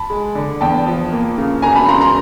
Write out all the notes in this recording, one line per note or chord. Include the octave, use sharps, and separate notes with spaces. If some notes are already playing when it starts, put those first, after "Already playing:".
Already playing: A5 B5
G#3
D3
E2 G5 A5
F3
A#3
C#3
E1 G#5 A#5
A5 B5
C#3 A#5 C6
A#5 C6